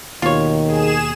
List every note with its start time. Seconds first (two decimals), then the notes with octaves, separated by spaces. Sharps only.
0.22 D#2 B2 D#3 F4 C#5
0.66 G#4 E7